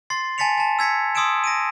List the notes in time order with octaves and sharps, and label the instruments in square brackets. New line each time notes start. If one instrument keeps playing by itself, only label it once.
[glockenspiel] C6 A6 C7
G#5 A5 A6 B6 C#7 F7
G#5 A5
E6 G#6 B6 C#7
C6 D#6 E6 G#6 D7 E7
A#6 D7 D#7